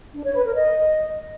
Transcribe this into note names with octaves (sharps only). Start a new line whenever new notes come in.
D4
C#5
B4
A#4
D#5